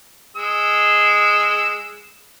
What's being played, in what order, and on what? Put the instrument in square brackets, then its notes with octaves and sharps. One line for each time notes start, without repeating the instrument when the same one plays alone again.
[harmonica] G#3 E6